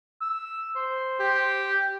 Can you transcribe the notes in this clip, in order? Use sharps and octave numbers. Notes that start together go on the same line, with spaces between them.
E6
C5
G4